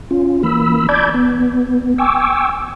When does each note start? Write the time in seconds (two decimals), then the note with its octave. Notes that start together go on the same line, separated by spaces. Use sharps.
0.11 C#4 F4
0.43 E3 A#3 B5 E6
0.89 D5 A5 B5 D6 G6 G#6
1.14 B3
1.98 G5 G#5 C#6 D6 E6